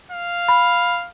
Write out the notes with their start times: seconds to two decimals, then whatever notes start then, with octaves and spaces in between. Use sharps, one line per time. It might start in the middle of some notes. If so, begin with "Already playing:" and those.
0.11 F5
0.48 B5